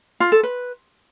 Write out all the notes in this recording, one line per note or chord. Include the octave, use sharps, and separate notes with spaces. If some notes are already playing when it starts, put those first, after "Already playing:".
F4
A4
B4